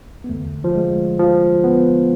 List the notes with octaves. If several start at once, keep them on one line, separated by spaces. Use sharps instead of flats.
B3
E2 D3 A3
F3
G#3
F3
B3